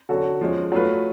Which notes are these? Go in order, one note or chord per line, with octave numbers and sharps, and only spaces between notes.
D3 F#3 C#4 F#4 A4
F3 G#3 C#4
F#3 A3 F4 B4